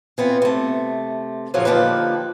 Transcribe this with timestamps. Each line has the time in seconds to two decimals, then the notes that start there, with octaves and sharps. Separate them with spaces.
0.18 E3 B3 C4 F4
0.42 C3 A3
1.54 F#2 A#2 C#3 F3 F#3 C#4
1.65 D3 F3 A#3 D#4 G4 B4